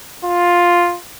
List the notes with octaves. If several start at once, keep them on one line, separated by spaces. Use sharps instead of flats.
F4